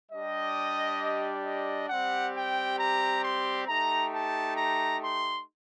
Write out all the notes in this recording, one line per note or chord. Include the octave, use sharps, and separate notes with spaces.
G3 D4 G4 D#5
D#5
G3 C4 G4 F#5
G5
A#5
C6
A3 D#4 G4 A#5
A5
A#5
C6